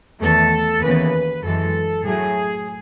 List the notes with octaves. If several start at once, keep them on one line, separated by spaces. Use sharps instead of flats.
E2 D#3 A3 A4
D#2 C#3 E3 B3 B4
F#2 E3 G#3 A4
A2 F#3 A3 G#4